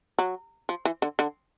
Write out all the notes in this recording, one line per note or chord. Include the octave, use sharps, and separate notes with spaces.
F#3
F3
E3
D3
D3